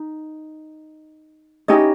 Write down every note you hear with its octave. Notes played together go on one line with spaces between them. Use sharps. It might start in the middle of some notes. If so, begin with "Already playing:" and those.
Already playing: D#4
C#4 D#4 E4 G4 D#5